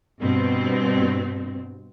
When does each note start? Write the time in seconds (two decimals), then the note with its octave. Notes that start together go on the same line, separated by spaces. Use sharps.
0.19 G2 B2 C4